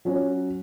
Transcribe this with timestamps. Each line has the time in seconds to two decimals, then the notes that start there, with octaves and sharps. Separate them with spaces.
0.05 F#3 C#4 F#4 C#5